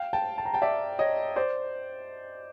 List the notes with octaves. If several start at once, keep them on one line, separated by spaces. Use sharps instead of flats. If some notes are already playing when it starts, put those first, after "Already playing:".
Already playing: F5 G5
G5 A5
A5
A#5
G5 A5
D5 E5
C#5 D#5
C5 D5